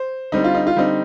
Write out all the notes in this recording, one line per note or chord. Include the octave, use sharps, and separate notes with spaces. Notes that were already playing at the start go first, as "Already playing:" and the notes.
Already playing: C5
D3 G3 C4 D#4
F4
D#4
F4
D3 G3 C4 D#4